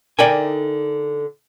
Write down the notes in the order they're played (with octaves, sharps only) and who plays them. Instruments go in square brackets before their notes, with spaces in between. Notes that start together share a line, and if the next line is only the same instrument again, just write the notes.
[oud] D3 D#4 A#4 [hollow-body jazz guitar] D5 G5 G#5